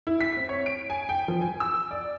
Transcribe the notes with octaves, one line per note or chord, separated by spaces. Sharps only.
E4
B6
C4
C#5
D7
G#5
G5
F3
G#5
E6
D5